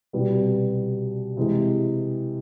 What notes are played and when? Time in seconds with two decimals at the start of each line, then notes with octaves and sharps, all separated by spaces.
0.13 C2 B2 G3 B3
1.37 C3 E3 G#3